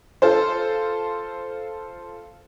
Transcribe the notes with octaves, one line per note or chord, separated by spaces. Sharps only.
F4 A4 C5